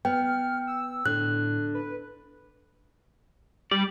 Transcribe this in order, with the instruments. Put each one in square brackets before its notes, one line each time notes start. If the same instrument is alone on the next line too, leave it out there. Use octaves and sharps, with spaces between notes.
[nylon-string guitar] B3 [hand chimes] G5 [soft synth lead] F6
[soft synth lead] E6
[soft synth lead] A2 [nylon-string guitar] D3 [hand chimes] F#6
[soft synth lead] B4
[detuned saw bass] G3 [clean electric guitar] D5